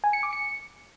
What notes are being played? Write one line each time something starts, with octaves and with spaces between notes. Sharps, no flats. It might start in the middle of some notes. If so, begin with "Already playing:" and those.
G#5
C#7
D6
C#7